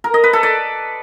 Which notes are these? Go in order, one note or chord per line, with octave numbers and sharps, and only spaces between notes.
A#4
D#5
B4
A4
D5